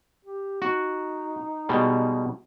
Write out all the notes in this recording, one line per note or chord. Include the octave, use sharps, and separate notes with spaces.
G4
D#4 F#4
B2 G3 G#3